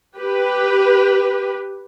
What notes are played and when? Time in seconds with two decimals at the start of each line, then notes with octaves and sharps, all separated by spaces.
0.17 G4 B4